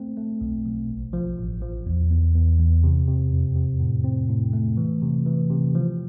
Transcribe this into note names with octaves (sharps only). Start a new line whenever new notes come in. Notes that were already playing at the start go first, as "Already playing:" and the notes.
Already playing: A3 C4
A3
B1
B1
A1
F3
A1
F3
E2
E2
E2
E2
C3
C3
F2
C3
A2
C4
A2
A3
E3
C3
E3
C3
F3